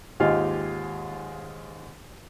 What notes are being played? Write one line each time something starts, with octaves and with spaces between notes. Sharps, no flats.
D#2 G#2 G#3 F4 G4 F5